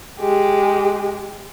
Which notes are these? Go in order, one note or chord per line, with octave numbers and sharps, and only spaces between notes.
G#3 G4